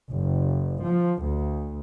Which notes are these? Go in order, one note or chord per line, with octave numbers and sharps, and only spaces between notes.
F#1
F3
D2